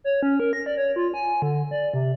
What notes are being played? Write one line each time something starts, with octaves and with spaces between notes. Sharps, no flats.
C#5
C#4
A#4
A#6
D5
C#5
F4
G#5
D3
D5
C3